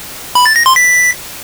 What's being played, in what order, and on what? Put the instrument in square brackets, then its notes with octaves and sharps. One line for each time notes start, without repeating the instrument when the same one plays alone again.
[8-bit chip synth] B5
A6
A#6
C6
B6